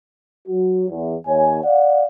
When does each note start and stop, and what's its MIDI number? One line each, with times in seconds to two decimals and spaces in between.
0.47 0.84 54
0.47 0.84 66
0.89 1.14 40
1.26 1.58 39
1.26 1.58 73
1.26 1.58 80
1.63 2.04 74
1.63 2.04 77
1.63 2.04 78